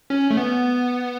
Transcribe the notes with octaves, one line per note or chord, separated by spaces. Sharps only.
C#4
A3
B3